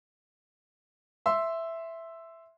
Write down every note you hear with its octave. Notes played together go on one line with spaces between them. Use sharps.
E5 C6 E6